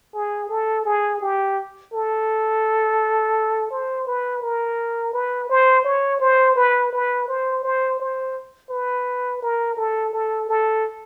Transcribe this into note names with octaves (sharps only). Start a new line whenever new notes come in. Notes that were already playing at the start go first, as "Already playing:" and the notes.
G#4
A4
G#4
G4
A4
C5
B4
A#4
B4
C5
C#5
C5
B4
B4
C5
C5
C5
B4
A#4
A4
A4
A4